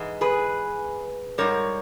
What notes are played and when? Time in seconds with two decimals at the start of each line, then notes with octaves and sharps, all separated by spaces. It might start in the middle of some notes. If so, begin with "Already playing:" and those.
Already playing: G#2 E3 G#3
0.21 G#4 B4
1.38 G#2 G3 A#4 C#5